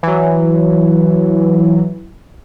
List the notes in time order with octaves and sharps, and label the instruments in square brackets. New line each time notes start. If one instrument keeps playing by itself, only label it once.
[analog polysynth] E3 F#3